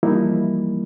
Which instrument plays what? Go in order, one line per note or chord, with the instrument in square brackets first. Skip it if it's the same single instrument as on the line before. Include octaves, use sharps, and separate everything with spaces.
[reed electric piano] E3 F3 G3 A#3 D#4 E4